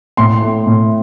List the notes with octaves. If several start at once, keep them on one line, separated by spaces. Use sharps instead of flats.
A2 C6
A3
A2